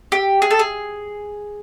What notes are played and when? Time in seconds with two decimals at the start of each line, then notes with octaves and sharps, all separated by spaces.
0.12 G4
0.42 G#4
0.51 A4
0.59 G#4